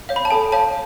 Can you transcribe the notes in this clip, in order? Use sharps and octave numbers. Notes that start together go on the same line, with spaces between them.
C#5 F5
B5
A5
A4 G#5
C#5 F5 A5